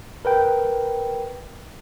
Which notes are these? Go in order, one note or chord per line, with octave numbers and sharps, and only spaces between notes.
A#4 B4 G5